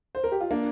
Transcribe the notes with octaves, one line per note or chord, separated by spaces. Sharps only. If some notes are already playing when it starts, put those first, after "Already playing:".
C5
A#4
G4
F4
A#3 D4